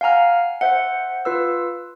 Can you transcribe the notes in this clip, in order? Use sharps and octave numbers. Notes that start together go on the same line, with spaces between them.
F5 F#5 G#5 A#5 F6
C5 E5 F#5
F4 B4 E6